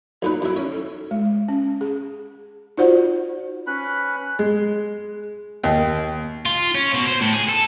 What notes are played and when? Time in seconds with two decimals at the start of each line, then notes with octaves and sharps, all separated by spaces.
0.22 B1 A#2 D#4 B4
0.42 F#2 E4 E5
0.56 C#4 C#5
0.69 A4
1.11 G#3
1.49 C#4
1.81 G#4
2.77 D#4 F4 F#4 C5 D5 F#5
3.67 C#4 B4 B5 F#6
4.39 G#3
5.64 D#2
6.46 F4
6.75 C#4
6.94 B2
7.07 C5
7.21 A2
7.33 G#4
7.49 A4